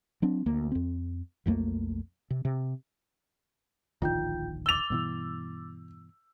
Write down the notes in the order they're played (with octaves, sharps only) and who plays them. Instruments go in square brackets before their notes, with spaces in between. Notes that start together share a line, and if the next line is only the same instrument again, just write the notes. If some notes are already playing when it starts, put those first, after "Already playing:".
[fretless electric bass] F#3 C4 D4
D2 A#3
F2 C4
B1 F2 A3 A#3
C3
C3
[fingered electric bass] D1 A#1 D#3 [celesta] F4 G5 G6
[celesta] D6 A6 G7 [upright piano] E6 F7
[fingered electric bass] G2 B2 E3